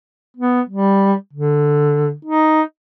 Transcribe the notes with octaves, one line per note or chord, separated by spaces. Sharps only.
B3
G3
D3
D#4